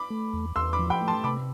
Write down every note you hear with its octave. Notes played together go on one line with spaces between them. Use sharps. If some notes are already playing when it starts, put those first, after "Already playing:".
Already playing: B5 D6
A3
E2
E2 C6 E6
B5 D6
F3
G5 B5
A3
A5 C6
C3 B5 D6